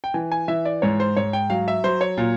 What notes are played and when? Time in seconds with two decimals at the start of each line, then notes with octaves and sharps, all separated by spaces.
0.04 G5
0.14 E3 G#5
0.32 G#5
0.48 E3 E5
0.65 D5
0.82 G#2 C#5
1.00 C5
1.17 G#2 C#5
1.33 G5
1.50 F#3 F5
1.68 E5
1.84 F#3 C5
2.01 C#5
2.17 A#2